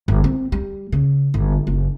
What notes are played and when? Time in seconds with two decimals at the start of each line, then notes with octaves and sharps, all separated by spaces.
0.08 G1
0.24 C4
0.52 G3
0.92 C#3
1.34 G1
1.67 F#1